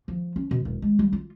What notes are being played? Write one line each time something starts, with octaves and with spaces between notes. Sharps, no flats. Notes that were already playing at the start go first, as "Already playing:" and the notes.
F3
C#4
B2
E1
G#3
G3
F4